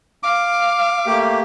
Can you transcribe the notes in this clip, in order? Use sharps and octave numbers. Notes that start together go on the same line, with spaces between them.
F5 D6
A3 A#3 G4